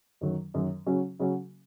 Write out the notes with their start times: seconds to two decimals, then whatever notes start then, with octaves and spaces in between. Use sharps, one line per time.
0.21 F#2 D#3 F#3
0.54 F#2 D#3 F#3
0.86 C#3 F#3 C#4 F#4
1.19 C#3 F#3 C#4 F#4